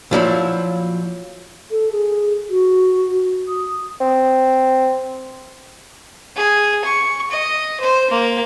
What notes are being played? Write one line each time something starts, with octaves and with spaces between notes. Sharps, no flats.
A#2 F3 F#3 E4
A4
G#4
F#4
D#6
C4
G#4
C#6
D#5
C5
A#3